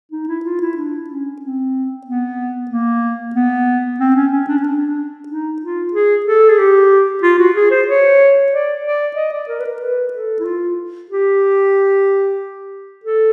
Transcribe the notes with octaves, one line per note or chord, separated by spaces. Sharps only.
D#4
E4
F4
E4
D4
C#4
C4
B3
A#3
B3
C4
C#4
C#4
D4
C#4
D4
D#4
F4
G#4
A4
G#4
G4
F4
F#4
G#4
C5
C#5
D5
D5
D#5
D5
A#4
B4
A#4
B4
A4
E4
F4
G4
A4